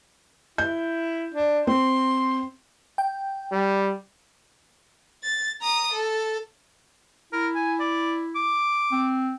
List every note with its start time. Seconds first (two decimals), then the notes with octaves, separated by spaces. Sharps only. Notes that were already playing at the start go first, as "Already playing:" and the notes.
0.58 E4 G6
1.34 D4
1.67 C4 C6
2.98 G5
3.52 G3
5.23 A6
5.61 A#5 D#6
5.93 A4
7.33 E4 A#4
7.55 G#5
7.80 D5
8.36 D6
8.92 C4